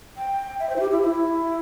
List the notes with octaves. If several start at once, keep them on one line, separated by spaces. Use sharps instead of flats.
G5
E5
C5
E4
G4
E4
E4